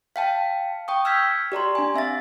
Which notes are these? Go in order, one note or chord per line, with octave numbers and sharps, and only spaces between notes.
F5 G5 A5
G5 C#6 D#6
E6 F6 G6 G#6 B6
G4 D5 A#5 C6
D4 G#5
C4 E5 F5 A6